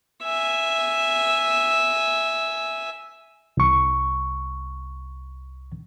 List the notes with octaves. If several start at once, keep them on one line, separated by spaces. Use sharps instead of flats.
E5 G#5
C2 C#6